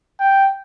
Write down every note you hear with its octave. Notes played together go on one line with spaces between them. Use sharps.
G5